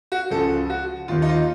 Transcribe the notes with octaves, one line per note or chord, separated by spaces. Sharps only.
F#4
C#2 C#3 F3 A4
F#4
D#2 D#3 F4
D#4
F4